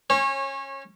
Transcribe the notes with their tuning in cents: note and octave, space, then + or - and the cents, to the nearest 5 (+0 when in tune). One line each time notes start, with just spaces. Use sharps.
C#4 -20 C#5 -30